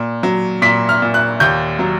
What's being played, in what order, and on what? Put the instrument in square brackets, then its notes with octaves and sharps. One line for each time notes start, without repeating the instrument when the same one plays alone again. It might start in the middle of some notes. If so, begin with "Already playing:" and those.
Already playing: [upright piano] A#2
F#3
A#2 B6
F6
A#2
F#6
D#2 G6
F#3